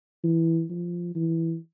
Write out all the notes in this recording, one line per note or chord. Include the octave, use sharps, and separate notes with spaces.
E3
F3
E3